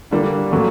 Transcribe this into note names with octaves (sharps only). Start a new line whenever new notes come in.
D3 G3 A#3 D4
A#2 F#3 A3